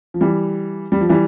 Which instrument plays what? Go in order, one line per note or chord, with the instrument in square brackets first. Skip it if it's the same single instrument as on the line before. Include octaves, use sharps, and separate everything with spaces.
[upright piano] F3
E3 G3
G3
F3
E3 G3